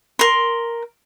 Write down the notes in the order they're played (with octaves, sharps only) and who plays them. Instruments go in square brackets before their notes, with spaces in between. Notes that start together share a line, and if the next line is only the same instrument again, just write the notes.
[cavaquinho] A#4 C6